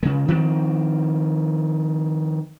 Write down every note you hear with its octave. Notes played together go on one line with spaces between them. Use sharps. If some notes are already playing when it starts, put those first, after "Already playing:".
C#3 G#3
D#3 F3 C4